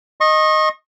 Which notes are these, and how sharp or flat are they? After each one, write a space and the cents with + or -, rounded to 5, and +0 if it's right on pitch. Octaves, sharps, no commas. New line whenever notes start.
D#5 +0 C#6 -35